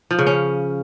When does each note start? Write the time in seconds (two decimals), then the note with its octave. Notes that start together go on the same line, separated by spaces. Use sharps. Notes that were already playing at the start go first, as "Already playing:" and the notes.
0.11 F3
0.19 C#3
0.27 C#4